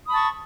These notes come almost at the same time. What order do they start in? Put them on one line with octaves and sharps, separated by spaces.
D#6 B5 A5 C#6